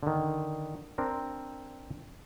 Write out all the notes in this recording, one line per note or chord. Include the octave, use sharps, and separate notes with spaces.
D3 D#3
C4 D4 A#4